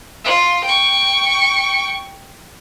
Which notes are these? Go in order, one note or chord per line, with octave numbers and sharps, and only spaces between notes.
F4
G5 C#6